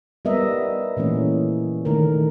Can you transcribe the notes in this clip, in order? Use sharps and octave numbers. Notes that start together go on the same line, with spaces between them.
G3 B3 A#4 D#5 E5
A#2 E3 A3 C#4
D#3 A3 A#4